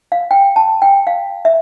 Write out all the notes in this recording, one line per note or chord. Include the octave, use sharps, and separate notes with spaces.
F5
G5
A5
G5
F5
E5